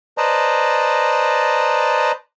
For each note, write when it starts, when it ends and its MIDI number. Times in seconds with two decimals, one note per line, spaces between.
0.18 2.12 71
0.18 2.12 72
0.18 2.12 74
0.18 2.12 75
0.18 2.12 81
0.18 2.12 82